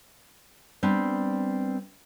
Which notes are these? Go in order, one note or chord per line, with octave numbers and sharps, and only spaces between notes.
G3 B3 C4 D4